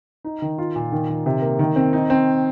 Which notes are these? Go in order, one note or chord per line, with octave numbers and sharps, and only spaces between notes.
D#4
D#3
F4
A#2
D#3
D#3
C3
A#3
D#3
C4
D#4
C4